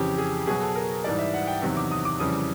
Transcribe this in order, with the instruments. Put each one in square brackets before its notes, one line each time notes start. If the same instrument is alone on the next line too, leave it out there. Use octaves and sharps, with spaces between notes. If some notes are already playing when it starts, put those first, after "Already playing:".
Already playing: [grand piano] F2 C#3 E3 G4
G#4
B2 F#3 G#4
A4
A#4
G#2 E3 G3 D5
E5
F#5
G5
E2 C3 D#3 F#3
D6
D#6
D6
F2 C#3 E3 G3 D#6